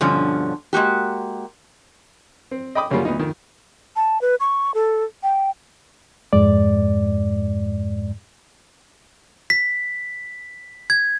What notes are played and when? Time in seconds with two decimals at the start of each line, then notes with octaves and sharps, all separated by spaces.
0.01 G2 B2 D3 F3 C#4
0.73 G#3 A#3 F#4 G4
2.51 C4
2.75 D#5 G5 B5 D6 D#6
2.90 F#2 C#3 F#3 G3 A#3 F4
3.05 D2 B3 D#4
3.19 F2 D#3
3.96 A5
4.22 B4
4.40 C#6
4.74 A4
5.23 G5
6.33 F2 G#2 G#3 D5
9.50 B6
10.90 G#6